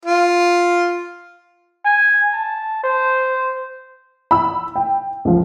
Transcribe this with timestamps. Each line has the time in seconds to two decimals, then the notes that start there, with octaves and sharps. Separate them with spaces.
0.05 F4
1.85 G#5
2.33 A5
2.84 C5
4.31 B5 E6
4.76 G5
5.25 C#2 F3